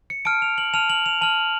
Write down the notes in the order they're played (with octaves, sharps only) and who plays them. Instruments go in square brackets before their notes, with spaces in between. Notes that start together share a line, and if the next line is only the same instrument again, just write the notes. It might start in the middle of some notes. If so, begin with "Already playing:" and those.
[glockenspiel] C#7
A5 F6 D7
F7
F#7
A5 F6 F7
F#7
F7
A5 F6 F#7